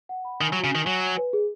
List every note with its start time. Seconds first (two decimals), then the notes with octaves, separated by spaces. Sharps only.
0.09 F#5
0.25 B5
0.41 D#3 G#5
0.53 F#3
0.56 F#4
0.64 C#3
0.71 D#3 G#5
0.86 F#3 G#5
1.02 G#5
1.18 B4
1.33 G#4